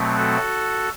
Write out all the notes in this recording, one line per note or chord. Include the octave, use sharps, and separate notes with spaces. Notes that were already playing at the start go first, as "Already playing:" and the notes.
Already playing: B2 F#3 A3 C4
F#4 A4